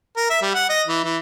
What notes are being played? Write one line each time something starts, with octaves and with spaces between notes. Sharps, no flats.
A#4
E5
G3
F#5
D#5
E3
E3